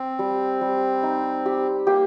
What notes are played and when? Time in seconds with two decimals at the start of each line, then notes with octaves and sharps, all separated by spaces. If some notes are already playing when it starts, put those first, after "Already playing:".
Already playing: C4 C5
0.19 G3
0.61 G3
1.03 D#4
1.46 G4
1.87 A#3 G4